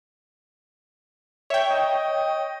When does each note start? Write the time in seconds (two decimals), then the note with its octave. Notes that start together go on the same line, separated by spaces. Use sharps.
1.50 C#5 E5 G5
1.70 D#5